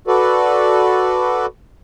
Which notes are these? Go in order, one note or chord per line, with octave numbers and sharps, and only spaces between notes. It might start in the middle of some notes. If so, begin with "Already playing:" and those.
F#4 A4 B4 D5